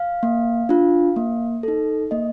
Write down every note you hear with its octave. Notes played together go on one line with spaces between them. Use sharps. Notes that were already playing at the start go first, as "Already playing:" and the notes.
Already playing: F5
A#3
D4 F4
A#3
D#4 A4
A#3 D#5